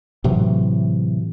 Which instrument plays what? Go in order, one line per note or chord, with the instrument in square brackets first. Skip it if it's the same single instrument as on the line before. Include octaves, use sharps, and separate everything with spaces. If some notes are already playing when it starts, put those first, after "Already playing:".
[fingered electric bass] A2 C3 E3 F#3